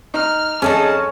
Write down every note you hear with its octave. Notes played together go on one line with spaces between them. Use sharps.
D#4 F6
F2 C#4 D#4 E4 G#4 A5